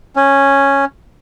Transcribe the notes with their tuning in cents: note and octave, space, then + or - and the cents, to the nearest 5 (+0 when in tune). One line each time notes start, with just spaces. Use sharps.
C#4 -5